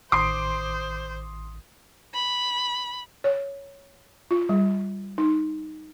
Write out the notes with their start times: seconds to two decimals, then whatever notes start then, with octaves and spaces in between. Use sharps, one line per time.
0.12 A1 D#3 C5 C6 D6 D#6 C7
2.14 B5
3.24 C#5
4.31 F4
4.49 G3
5.18 D#4